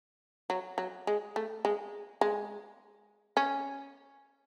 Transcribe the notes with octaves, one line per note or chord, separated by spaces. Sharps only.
F#3
F#3
G#3
A3
G#3
G#3
C#4